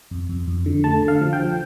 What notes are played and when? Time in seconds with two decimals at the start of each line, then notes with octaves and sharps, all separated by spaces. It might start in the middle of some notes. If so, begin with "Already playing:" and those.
0.11 F2
0.29 F2
0.47 F2
0.66 D3
0.84 A3 A5
1.03 D3
1.08 F5
1.21 F3
1.33 G5
1.39 F3